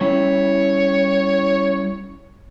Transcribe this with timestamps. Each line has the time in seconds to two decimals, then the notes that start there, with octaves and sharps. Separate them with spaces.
0.01 G3 C#4 E4 C#5